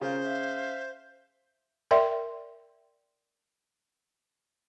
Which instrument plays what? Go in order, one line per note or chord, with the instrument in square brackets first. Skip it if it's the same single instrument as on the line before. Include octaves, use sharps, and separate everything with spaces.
[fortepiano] C#3 [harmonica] F4 A#4 [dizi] C5
[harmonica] E5 F5
[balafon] A#4 D5 E5 G5 C6